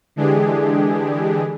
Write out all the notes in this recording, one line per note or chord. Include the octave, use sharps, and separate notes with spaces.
D3 E3 G#3 D4 G4 G#4